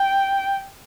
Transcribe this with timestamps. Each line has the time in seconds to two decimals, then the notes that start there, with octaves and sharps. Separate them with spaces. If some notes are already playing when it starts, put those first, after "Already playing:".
Already playing: G5